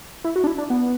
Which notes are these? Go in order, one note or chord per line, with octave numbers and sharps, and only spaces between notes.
E4
F#4
D4
E4
D4
B3